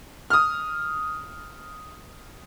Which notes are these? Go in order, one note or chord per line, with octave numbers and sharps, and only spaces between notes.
D#6 F6